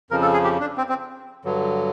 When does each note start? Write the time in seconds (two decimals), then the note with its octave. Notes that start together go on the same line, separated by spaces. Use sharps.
0.11 F2 C#3 F3 A#4
0.22 A4
0.33 G#4
0.44 G4
0.61 D4
0.78 C4
0.89 C4
1.45 G2 D3 F#3